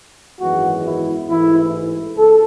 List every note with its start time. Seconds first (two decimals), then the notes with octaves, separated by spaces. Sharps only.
0.40 G#1 F#2 E3 G#3 B3 F#4
0.84 E4
1.28 A1 G#2 E3 A3 E4
2.16 C#2 A4